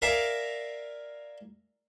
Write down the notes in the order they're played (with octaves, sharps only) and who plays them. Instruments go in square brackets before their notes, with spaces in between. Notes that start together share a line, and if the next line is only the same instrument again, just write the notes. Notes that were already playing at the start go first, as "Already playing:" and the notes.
[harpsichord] A#4 D5 E5 F5 G#5 A#5